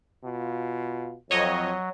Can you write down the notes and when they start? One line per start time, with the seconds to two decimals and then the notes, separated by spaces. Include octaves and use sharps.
0.24 B2 F4
1.31 F2 F#3 C#5 D#5